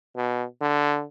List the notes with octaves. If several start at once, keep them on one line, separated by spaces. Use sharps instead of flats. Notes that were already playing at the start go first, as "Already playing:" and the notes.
B2
D3